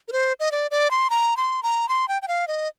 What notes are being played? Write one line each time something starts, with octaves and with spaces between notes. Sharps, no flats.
A#4
C5
D#5
D5
D5
C6
A#5
C6
A#5
C6
G5
G5
F5
D#5